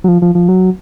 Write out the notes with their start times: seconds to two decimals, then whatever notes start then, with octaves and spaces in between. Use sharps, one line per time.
0.04 F#3
0.08 F3
0.22 F3
0.35 F3
0.49 F#3